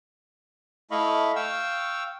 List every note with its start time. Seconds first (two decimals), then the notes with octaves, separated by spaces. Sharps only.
0.91 A3 E4 D#5 F5 B5 C#6
1.36 F5 G5 C#6 E6